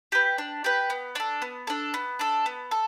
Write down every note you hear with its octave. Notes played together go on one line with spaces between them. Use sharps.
G4 B4
D4
G4 B4
B3
D4 A4
B3
D4 A4
B3
D4 A4
B3
A4